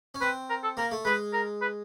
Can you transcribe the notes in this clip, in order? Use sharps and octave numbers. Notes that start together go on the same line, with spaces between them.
C#4
C4 B4
A#4
A4
A#3 A#4
A3
G#3 B4
A#4
B4